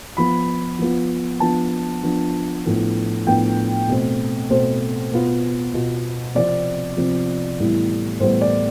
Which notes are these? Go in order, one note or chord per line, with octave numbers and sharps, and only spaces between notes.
F3 B3 F4 B5
F3 B3 F4
F3 B3 D4 F4 A5
F3 B3 D4 F4
A2 F3 B3 D4
A2 F3 B3 D4 G5
B2 A3 C4
B2 A3 C4 C5
B2 B3 F4
B2 B3 F4
C3 F3 C4 F4 D5
C3 F3 C4 F4
A2 E3 G3 B3 E4
A2 E3 G3 B3 E4 C5
D5